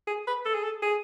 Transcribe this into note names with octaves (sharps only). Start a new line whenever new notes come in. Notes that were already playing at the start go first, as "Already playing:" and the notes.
G#4
B4
A4
G#4
A4
G#4